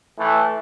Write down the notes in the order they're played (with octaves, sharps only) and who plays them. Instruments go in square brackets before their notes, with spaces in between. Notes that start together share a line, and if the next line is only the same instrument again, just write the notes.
[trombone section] A2 E3 A3